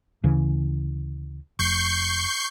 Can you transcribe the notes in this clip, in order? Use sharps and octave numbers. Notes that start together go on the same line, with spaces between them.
D2 C#3 E3
F1 C#6 G6 C7